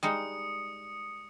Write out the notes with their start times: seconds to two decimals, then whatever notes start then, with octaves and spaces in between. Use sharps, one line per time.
0.03 G3 G#3 D#4 D#6 C#7